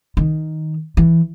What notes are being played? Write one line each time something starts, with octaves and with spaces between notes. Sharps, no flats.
D#3
E3